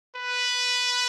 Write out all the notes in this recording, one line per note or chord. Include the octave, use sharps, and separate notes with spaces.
B4